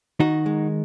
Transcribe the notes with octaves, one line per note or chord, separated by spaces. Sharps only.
D#3 D#4 F#4
G#3